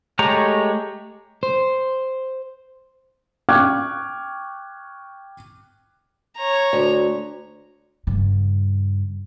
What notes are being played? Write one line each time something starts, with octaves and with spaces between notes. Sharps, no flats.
G#3 A3 G4 C#5 A#5
C5
G5 C#6 D6 F6 F#6 G#6
C#5 A#5
D2
G2 C#3